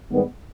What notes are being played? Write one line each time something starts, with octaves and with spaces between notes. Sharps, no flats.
G#2 D#3 G3 B3